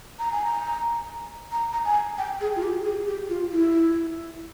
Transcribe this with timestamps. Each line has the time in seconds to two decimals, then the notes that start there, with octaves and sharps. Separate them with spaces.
0.19 A#5
0.32 G#5
0.45 A#5
1.52 A#5
1.73 A#5
1.85 G#5
2.18 G5
2.41 G#4
2.56 F4
2.63 G4
2.85 G#4
3.07 G4
3.29 F4
3.52 E4